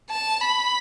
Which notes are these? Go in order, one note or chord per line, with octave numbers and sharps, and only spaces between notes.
A5
B5